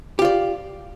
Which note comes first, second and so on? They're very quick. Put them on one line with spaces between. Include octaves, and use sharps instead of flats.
G4 F4 D5